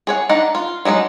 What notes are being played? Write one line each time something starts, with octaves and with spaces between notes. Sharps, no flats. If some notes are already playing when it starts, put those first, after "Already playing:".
G#4 C#5 F#5
D4 D#4 F#5
F4
F#3 G#3 D4 D#4